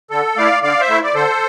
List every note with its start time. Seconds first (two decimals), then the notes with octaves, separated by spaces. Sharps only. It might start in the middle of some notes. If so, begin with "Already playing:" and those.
0.11 D3 A4
0.37 A3 E4 D5 F5
0.63 D3 D5 F5
0.80 C5 E5
0.89 A3 E4
1.04 D5
1.14 D3 A4 C5